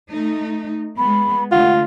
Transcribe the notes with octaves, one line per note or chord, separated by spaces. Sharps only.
A3 D#4
G#3 B3 B5
D3 A3 F4 F#5